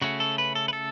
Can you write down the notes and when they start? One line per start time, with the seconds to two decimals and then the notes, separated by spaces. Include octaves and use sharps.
0.02 C#3 A3 C#4 F#4
0.20 A4
0.38 B4
0.55 A4
0.68 B4
0.73 A4